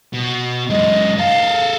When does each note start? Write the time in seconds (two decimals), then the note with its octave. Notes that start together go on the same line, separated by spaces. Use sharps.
0.13 B2
0.70 F#2 G#3 D#5
1.18 A4 A#4 F5